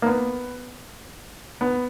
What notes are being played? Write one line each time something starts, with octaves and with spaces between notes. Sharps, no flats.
A#3
B3
B3